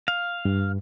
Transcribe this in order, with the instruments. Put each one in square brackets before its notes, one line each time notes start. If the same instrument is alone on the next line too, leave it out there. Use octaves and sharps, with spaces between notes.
[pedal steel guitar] F5
[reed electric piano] G2